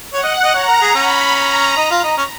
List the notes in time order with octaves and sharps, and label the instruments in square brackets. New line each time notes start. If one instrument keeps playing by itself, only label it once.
[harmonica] C#5 [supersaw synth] F#5
[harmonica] D#5
D#5
[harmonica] C#5 [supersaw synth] A#5
[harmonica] A#4
G#4
[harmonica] C#4 [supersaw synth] B5
[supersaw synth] A#5
[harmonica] D#4
F4
D#4
C#4